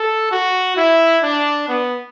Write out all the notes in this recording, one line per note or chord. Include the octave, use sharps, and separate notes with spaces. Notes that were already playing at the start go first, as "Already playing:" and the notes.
Already playing: A4
F#4
E4
D4
B3